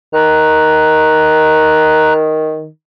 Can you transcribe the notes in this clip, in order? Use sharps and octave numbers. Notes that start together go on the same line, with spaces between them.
D#3 A#5 F#6